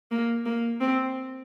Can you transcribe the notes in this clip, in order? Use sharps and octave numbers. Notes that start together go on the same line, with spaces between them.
A#3
A#3
C4